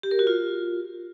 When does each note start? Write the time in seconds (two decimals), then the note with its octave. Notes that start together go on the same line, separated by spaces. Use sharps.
0.03 G4
0.11 A#4
0.19 F#4
0.27 F4